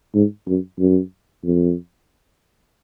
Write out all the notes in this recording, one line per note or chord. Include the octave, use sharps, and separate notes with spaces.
G#2
F#2
F#2
F2